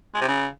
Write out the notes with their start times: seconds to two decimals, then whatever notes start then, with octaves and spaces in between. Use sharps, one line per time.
0.14 G#3
0.21 C3
0.28 C#3